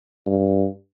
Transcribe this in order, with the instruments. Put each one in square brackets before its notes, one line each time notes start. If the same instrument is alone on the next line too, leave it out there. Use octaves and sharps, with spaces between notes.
[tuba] G2